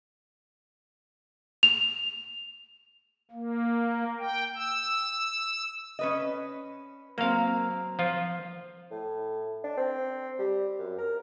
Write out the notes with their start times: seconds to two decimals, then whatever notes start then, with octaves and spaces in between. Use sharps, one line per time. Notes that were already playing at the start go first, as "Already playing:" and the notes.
1.63 F7
3.31 A#3
4.19 G5
4.55 E6
5.99 C#4 B4 D#5
7.18 F#3 A#3 C4 F5
7.99 F3 F4
8.91 A2
9.64 D4
9.77 C4
10.39 G3
10.79 F#2
10.98 A#4